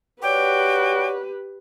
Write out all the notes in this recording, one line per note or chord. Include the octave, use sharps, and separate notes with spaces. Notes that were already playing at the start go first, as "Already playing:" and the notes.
F#4 G4 B4 C#5 D5 G5 D6